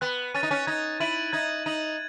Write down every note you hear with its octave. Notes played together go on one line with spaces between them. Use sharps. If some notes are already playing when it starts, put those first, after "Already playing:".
B3 F#6
C#4 A6 D#7
D#4
C#4
D#4 G#6
E4 D#7 F#7
D#4 G#6
D#4 D#7 F#7